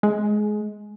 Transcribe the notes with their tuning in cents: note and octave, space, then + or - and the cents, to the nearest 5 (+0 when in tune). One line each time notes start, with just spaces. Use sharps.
G#3 +20